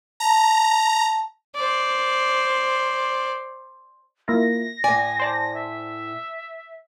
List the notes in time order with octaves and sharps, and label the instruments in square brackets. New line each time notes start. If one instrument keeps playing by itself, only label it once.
[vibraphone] A5 [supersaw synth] A#5
[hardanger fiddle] C5 D5
[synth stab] A#3 E4 F4 [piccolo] A#6
[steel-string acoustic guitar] A2 G#5 [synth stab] D5
[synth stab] C5 D5 A5
[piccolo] E5